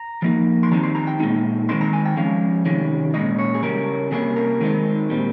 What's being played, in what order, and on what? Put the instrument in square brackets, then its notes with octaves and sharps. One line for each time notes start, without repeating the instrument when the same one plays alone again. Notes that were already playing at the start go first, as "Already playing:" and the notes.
Already playing: [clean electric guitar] A#5
F3 A#3 D#4
C6
D#3 G3 C4 D#4 A#5
C6
A#5
G5
A#2 G#3 C4 D#4
D#3 G#3 C4 D#4 C6
A#5
G#5
G5
F3 G#3 C#4 F5
C3 D#3 G3 C#4
A#2 G#3 C#4 D#5
C#5
G#4
C#3 G3 C#4 A#4
C3 G3 A#3 C#4 G#4
A#4
D#3 G#3 C4 D#4
A#2 G3 C4